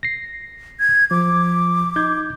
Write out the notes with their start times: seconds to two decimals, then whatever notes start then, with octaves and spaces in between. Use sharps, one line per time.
0.03 A#6 C7
0.80 G#6
1.11 F3 D6
1.96 D#4 G6 G#6